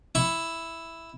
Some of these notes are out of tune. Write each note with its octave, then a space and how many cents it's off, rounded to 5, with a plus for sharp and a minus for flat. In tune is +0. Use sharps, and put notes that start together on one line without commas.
E4 +0 C#6 +0